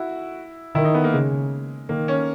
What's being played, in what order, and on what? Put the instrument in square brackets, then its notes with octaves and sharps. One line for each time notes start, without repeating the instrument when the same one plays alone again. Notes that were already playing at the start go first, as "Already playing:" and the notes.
Already playing: [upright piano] E4 F#4
[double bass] D#3 [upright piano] E4
[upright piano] D#4
B3
A#3
[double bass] C#3 [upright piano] G#3
[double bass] D#3 [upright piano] A#3
[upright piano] C#4